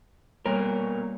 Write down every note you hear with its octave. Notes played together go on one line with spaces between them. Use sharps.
B2 G3 A#3 A#4 C#5